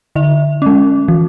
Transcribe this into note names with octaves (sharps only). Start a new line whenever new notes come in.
D3 E5
G#3 C#4
E3